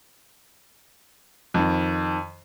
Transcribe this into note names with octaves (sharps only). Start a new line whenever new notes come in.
F2 D#3